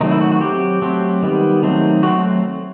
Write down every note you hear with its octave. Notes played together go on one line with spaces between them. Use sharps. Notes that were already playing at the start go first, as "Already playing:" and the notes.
D#3 F#3 A3 C4 D#4
E4
F#4
F#4
F#3 C4 G4
F#3 A3 C4
D#3 G3 B3
D#3 F#3 A3 C4
F#3 A3 C4 F#4